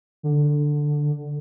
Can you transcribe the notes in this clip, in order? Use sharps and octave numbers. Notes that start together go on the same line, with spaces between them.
D3